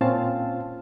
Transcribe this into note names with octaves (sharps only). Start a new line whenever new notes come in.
A#2 C4 C#4 F4 F5 A5